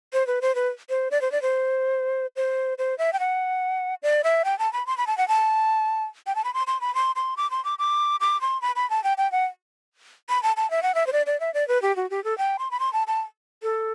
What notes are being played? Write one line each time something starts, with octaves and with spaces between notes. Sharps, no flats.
C5
B4
C5
B4
C5
D5
C5
D5
C5
C5
C5
E5
G5
F#5
D5
E5
G5
A5
B5
C6
B5
A5
F#5
A5
G5
A5
B5
C6
C6
B5
C6
C6
D6
C6
D6
D6
D6
C6
B5
B5
A5
G5
G5
F#5
B5
A5
A5
E5
F#5
E5
C5
D5
D5
E5
D5
B4
G4
F#4
G4
A4
G5
C6
B5
C6
A5
A5
A4